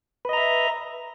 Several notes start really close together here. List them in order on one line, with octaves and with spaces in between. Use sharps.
B4 D#5 A#5 E5